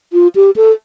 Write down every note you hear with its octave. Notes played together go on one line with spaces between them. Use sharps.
F4
G4
A4